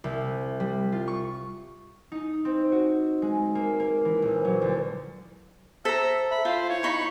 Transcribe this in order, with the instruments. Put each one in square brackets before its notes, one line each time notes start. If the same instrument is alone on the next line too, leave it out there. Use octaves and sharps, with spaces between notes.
[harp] C2
G3
F4
C#6
D#4
C4
F#4
G#3
A#3
A#3
E3
A#1
F#3
D2
[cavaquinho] A4 A#5 [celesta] C5 A6 B6 [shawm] E5
[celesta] E5 [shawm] B5
[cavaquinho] F4 [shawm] C5
[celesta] E4 F5 [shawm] C#5
[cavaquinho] D#4 B5 C#6